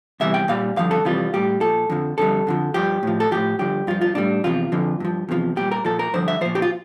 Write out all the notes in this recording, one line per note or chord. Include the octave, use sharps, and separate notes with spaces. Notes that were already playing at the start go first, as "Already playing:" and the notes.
E2 C3 E3 G3 E5
G5
A#2 G3 F5
G2 D3 F3 F5
A4
F2 C3 E3 G3 F4
A2 G3 G4
A#2 F3 A4
F2 D3 F3
F2 D3 G3 A4
F2 D3 F3
G2 F3 G4
A2 F3
A4
A2 F3 G4
G2 D3 F3 G4
G2 F3 F4
F4
A2 G3 D4
E2 C3 F3 F4
F2 D3 F3
G2 F3
E2 C3 F3
A#2 G3 G4
A#4
A#2 F3 A4
A#4
G2 D3 F3 C5
E5
A#2 F3 C5
G4
F4